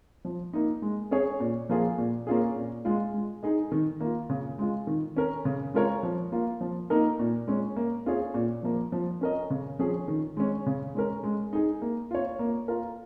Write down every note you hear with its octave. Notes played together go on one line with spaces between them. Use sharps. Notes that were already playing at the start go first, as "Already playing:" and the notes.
F3
A#3 D#4
G#3
C#4 G#4 C#5
A#2
F3 A#3 F4 G#4
A#2
A#3 C#4 F4 G#4
A#2
G#3 F4
G#3
D#4 G#4 D#5
D#3
A#3 F4
C#3
G#3 F4
D#3
C#4 A#4
C#3
G#3 F4 A#4 C#5
F3
A#3 F4
F3
A#3 D#4 A#4 D#5
A#2
G#3 C#4
A#3
C#4 F4 G#4 C#5
A#2
F3 A#3
F3
C#4 A#4 D#5
C#3
F3 C#4 G#4
D#3
G#3 C#4
C#3
G#3 C#4 A#4
G#3
D#4 G#4
A#3
F4 C#5
A#3
F4 A#4